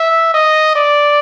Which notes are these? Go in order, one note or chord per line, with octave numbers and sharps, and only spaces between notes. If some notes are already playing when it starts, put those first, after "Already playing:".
Already playing: E5
D#5
D5